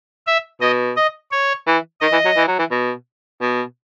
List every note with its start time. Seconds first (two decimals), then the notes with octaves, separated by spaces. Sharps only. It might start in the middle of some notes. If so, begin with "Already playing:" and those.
0.27 E5
0.61 B2 D#5
0.97 D#5
1.32 C#5
1.67 E3
2.01 D#3 D#5
2.13 E3
2.25 F#3
2.37 E3
2.48 F#3
2.59 E3
2.71 B2
3.41 B2